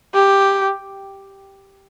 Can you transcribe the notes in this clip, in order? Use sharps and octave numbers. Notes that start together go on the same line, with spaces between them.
G4